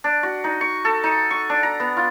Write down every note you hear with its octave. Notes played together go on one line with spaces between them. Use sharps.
D4
F#4
D#4
C#6
A4
D#4
C#6
D4
A#5
B3
F4